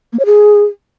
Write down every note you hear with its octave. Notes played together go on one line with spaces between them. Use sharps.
A#3
C#5
G#4